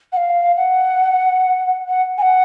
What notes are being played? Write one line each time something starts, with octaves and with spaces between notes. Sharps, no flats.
F#5
F5
F#5
F#5
G#5
F#5